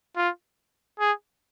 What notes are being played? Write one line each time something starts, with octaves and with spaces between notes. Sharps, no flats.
F4
G#4